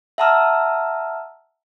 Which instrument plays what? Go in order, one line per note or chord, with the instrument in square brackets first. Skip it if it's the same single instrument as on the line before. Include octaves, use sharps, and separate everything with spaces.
[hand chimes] E5 F#5 A5 A#5 E6 F6